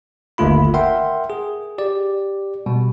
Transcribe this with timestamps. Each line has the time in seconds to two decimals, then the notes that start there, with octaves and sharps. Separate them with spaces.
0.38 G1 D#2 D3 A3 F4 B5
0.74 A#4 E5 F#5 G5 C6
1.30 G#4
1.78 G4 D5
2.66 B2 G3